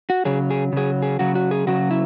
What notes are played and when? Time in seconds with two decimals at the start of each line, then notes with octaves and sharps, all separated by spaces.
0.10 F#4
0.25 C#3 F#3 G#4
0.51 G#4
0.73 C#3 F#3 G#4
1.02 G#4
1.19 C#3 F#3 F#4
1.35 F#4
1.51 G#4
1.67 C#3 F#3 F#4
1.91 E4